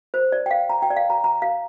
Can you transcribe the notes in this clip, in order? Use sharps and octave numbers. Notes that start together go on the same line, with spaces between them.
C5
D5
G5
F5
A#5
G5
D5
F5
A#5
A#5
F5